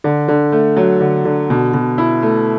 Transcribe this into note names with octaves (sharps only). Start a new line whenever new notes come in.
D3
D3
A3
F#3
D3
D3
B2
B2
E4
A3